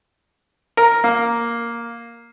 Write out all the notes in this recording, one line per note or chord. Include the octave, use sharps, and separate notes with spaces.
A#4
A#3